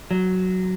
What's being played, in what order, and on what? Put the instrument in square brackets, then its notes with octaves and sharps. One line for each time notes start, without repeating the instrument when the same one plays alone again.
[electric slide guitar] F#3